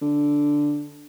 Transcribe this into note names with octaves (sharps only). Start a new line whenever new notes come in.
D3